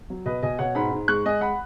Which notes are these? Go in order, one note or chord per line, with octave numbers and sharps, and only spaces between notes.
F#3
B2 B4 D#5
B2 D#5 G#5
B2 C#5 F#5
G#2 F#5 B5
G#2
G#3 C#6 F#6
G#3 D#5 G#5
F#5 B5